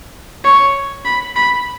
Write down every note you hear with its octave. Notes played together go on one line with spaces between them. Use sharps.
C#5
B5
B5